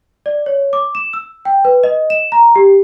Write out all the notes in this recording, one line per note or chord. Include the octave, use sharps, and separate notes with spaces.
D5
C#5
D6
E7
E6
G5
B4
D#5
E7
A#5
G4